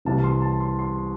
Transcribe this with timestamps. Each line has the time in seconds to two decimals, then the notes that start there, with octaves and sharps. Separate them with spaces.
0.05 C2 C3 E3 A5
0.24 C6
0.42 A5
0.60 C6
0.79 C6